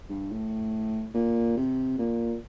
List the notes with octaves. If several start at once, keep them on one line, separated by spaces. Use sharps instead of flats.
G2
A2
A#2
C3
A#2